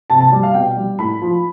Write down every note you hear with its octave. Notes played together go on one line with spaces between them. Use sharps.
C3 A5
A5
G3
F5
B2 G5
G3
A2 B5
F3